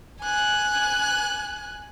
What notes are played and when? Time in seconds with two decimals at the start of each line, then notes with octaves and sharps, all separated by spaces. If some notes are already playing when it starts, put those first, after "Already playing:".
0.22 G#5 F#6